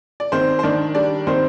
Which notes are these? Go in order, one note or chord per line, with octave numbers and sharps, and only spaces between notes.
D5
D#3 C4 C5
C5
D#3 D4 D5
G3 D4 D5
D#3 C4 C5